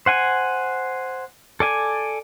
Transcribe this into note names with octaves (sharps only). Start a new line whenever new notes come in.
C5 F#5 G#5
A4 D5 G#5